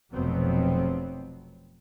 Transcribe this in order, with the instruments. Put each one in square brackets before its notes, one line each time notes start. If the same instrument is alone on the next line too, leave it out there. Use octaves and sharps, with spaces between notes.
[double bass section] F1 B1 F2 F#3 B3 C4